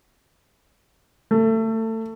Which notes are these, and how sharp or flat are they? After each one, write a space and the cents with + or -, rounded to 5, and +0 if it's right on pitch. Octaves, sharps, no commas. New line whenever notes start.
A3 +25